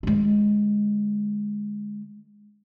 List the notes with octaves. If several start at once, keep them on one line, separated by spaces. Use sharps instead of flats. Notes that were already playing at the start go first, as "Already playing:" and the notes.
D3 G#3